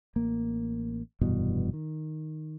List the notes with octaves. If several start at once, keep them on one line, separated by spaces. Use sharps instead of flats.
A1 A#3
F1 G2 B2 E3
D#3